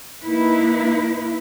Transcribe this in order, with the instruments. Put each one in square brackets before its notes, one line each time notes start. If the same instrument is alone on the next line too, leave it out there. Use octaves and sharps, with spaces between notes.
[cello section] A#3 D#4 E4 B4